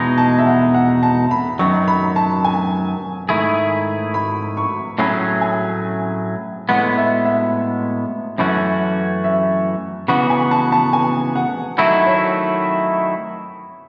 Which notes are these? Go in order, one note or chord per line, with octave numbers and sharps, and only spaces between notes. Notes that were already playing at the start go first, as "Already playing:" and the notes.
Already playing: E2 B2 G#3 D#4
A5
E5
F#5
F#5
A5
B5
F#2 D#3 F#3 C#6
B5
A5
G#5
G#2 D#3 A3 E4 G#4
B5
C#6
A2 F#3 A3 C#4 G#4 B5
G#5
A2 G#3 B3 F#5
E5
E5
F#2 E3 A3 C#4 F#4
E5
C#3 E3 B3 F#4 F#5
G#5
A5
A5
G#5
F#5
D#3 F#3 A3 E4 E5
C#5